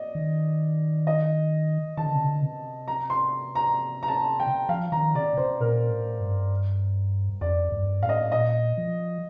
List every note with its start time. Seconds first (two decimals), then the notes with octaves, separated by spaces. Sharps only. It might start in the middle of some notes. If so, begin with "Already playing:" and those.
Already playing: D5 D#5
0.15 D#3
1.07 D#5
1.97 D#3 A5
2.06 D3
2.15 C3
2.24 D3
2.42 C3
2.88 A#5
3.10 C6
3.55 A#5
4.03 A#5
4.08 A5
4.40 G5
4.69 F3 F5
4.92 D#3 A#5
5.15 C3 D5
5.37 C3 C5
5.60 A#2 A#4
5.90 A2
6.20 G2
7.41 F2 D5
7.72 G2
8.02 A2 F5
8.09 D#5
8.32 A#2 D#5
8.77 F3